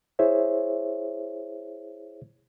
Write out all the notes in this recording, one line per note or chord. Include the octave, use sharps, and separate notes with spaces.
E4 G#4 C5 C#5 E5